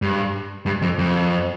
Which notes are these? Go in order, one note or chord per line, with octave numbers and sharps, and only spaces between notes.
G2
G2
F2
F2